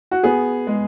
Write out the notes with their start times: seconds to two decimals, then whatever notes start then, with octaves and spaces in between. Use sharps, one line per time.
0.11 F#4
0.23 B3 G#4
0.67 G#3